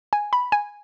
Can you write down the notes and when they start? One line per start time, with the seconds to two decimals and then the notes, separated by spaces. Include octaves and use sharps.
0.13 G#5
0.33 B5
0.52 G#5